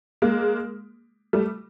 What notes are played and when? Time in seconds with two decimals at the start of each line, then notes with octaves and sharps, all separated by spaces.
0.22 G#3 A#3
1.33 G3 A3